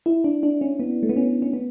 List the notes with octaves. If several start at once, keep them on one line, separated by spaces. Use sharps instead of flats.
E4
D4
D4
C#4
B3
A3
B3
C#4
C#4
B3